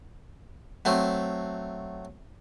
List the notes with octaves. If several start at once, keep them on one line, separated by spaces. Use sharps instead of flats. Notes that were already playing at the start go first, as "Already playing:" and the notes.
F#3 A3 C4